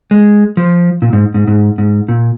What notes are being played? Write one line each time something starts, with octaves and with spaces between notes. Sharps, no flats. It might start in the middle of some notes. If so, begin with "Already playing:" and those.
G#3
F3
A#2
G#2
G#2
G#2
G#2
A#2